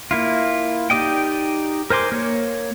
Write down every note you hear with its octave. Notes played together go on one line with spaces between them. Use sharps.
A#3 E4 F4
D#4 G4 D5 D#5 G5
A#4 C5 G#5 C6 D6
A#3 C#5